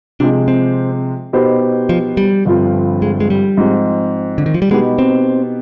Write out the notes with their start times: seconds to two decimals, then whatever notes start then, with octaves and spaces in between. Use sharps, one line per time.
0.20 C3 F3 G#3 D4
0.48 C4
1.33 B2 B3 D#4 G4 C5
1.89 F3
2.17 G3
2.45 G1 G2 F3 C4 F4
3.02 G#3
3.20 G#3
3.30 G3
3.57 G#2 F3 G#3 C4
4.38 D3
4.46 D#3
4.54 F3
4.62 G3
4.70 B2 G#3 B3 D#4 G4
4.99 C4